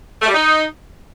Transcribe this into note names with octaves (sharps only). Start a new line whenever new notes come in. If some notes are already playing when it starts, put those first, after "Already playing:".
A3
G3
D#4